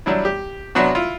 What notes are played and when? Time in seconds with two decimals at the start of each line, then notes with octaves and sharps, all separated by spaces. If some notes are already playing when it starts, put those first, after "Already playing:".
0.06 F#3 G3 D4 E4
0.25 G4
0.75 C3 F#3 B3 D4 F#4
0.95 E4 F4